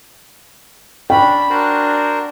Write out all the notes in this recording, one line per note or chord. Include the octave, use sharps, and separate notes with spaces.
C#4 D4 G5 B5
D4 F#4 A#4 C5